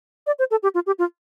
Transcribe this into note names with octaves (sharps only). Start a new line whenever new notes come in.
D5
C5
A4
G4
F4
G4
F4